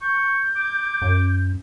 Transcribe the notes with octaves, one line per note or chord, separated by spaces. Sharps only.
C#6 G6
D6
F#2